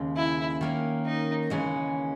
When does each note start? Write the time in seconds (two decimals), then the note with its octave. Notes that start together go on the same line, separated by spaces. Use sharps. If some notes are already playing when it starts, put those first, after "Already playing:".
Already playing: D#2 C#3 G#3
0.16 E4
0.61 D#3 A#3 C#4
1.05 D#4
1.50 D#2 C#3 E3 G#3 C#4